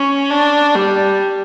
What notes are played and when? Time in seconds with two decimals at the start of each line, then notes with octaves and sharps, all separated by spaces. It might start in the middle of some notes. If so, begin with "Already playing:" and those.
Already playing: C#4
0.30 D4
0.75 G3